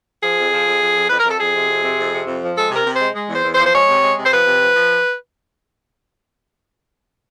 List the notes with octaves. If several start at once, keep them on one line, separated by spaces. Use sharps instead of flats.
F3 G#4
F2
F3
F2
F3
F2
F2 B4
A#4
F2 A4
F2 G#4
C3
F2
C3
F2
C3
F2
F3
G#3 A4
C3 A#4
C3
G#3 C5
G#3
E2
C5
E2
C5
F3
C5
G#3 C#5
C3
G#3
C3
C5
F3 B4
C3
F3
F3